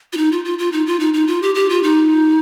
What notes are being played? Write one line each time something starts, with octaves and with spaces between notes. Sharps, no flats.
F4
D#4
F4
F4
F4
D#4
F4
D#4
D#4
F4
G4
G4
F4
D#4